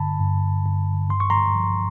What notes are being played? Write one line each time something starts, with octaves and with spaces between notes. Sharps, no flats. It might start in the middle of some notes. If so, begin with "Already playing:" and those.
Already playing: G2 D3 A5 B5
G2
G2
G2 C6
C#6
A#5 C6
F3